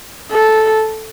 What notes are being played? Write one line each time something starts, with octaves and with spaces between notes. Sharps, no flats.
A4